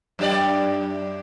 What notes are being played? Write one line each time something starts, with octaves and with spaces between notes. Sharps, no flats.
F#2 G4 D5